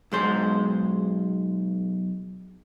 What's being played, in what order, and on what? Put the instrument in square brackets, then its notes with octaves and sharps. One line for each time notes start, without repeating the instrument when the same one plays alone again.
[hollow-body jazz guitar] B1 G#3 C5